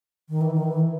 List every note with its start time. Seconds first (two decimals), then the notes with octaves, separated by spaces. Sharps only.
0.29 D#3
0.41 E3
0.54 D#3
0.64 E3